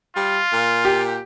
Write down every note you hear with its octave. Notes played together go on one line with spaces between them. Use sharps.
G3 F4
A#2
G4